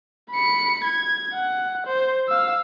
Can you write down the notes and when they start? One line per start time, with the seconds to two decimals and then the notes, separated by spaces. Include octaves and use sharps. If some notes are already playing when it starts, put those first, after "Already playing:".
0.32 B5 C#7
0.84 G#6
1.34 F#5
1.87 C5
2.29 F5 E6